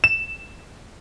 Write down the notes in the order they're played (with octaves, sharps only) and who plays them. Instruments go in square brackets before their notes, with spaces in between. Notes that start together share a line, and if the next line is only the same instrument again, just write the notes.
[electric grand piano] E7